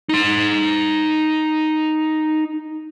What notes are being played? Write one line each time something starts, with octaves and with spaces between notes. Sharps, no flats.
D#4 C6